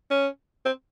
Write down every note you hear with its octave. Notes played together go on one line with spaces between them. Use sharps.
C#4
C4